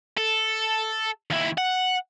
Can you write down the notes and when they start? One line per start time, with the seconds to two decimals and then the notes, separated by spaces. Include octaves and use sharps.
0.17 A4
1.30 D#2 E4
1.58 F#5